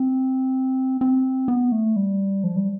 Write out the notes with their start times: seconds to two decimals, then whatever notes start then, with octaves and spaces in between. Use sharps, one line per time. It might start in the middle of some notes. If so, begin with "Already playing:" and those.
Already playing: C4
1.01 C4
1.48 B3
1.72 A3
1.96 G3
2.44 F3
2.56 G3